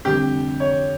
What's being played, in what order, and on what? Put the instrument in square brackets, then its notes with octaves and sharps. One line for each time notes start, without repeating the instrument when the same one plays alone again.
[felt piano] F1 F2 D3 G3 D4 [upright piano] G4
[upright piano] C#5